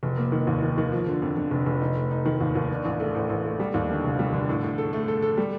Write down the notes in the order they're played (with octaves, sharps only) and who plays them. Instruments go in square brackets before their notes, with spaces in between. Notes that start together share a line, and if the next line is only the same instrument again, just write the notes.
[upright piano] F1
A#3
D#3
D#2
D#3
D#3
F3
D3
F2
D3
F1
F1
D#4
A3
D#4
D#3
D#2
D#2
D4
A1
A3
A1
A1
A3
G3
D#2
D3
F1
G3
D3
A2
A2
A4
A3
A4
A4
G3